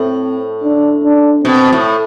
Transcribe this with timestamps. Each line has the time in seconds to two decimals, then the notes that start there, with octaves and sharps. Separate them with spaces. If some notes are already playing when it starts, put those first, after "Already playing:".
Already playing: A2 C4
0.64 D4
1.04 D4
1.44 B2 C4
1.72 A2